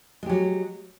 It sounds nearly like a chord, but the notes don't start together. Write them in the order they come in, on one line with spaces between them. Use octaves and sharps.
G#3 G4 F#3